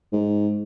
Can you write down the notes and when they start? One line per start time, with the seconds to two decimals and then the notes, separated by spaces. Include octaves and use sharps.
0.12 G#2